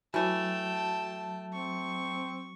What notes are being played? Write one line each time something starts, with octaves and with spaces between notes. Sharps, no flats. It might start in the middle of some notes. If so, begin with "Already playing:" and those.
E3 F#3 A3 G5 A5
C4 C#6